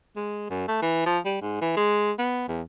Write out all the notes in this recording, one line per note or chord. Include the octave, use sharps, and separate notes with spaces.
G#3
F#2
A3
E3
F3
G3
G#2
E3
G#3
B3
E2